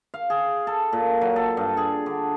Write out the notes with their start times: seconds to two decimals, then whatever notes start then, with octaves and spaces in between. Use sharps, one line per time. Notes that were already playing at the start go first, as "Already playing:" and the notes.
0.14 F5
0.30 G#4
0.67 A4
0.93 A#2
1.21 F#3
1.36 A4
1.57 G2
1.77 G#4
2.06 D3